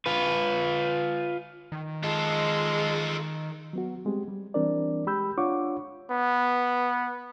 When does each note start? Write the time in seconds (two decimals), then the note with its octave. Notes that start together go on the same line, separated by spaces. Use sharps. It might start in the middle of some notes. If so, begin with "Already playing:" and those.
0.06 F4 B4
1.72 D#3
2.04 G#3 F4 A4
3.73 F#3 B3 F#4
4.05 G3 G#3 C4 G4
4.28 G3
4.54 E3 G3 C4 D4 A#4 D5
5.06 G#3 G4 B5 E6 G6
5.38 D4 F4 C#5 F#5 C#6 D6
6.11 B3